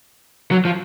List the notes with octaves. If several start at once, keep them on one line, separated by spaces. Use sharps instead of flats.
F#3
F3